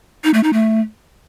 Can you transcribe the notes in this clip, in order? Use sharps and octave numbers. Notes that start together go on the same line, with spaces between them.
D#4
A3
D#4
A3